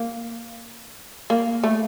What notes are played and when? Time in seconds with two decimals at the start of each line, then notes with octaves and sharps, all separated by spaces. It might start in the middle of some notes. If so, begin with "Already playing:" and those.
Already playing: A#3
1.30 A#3
1.63 A3